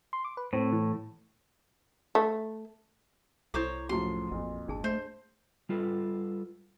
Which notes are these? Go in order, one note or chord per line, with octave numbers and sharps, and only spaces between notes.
C6
D6
B4
A2 C4
E3
A3
C2 E4 A4 C5 C#5 A#5 D6
F#2 A2 F3 F#4 G#4 A#5 C6
A1 F2 A#2
G#1 D4 G#4 A5
A3 C5
G3 F4 A4 B4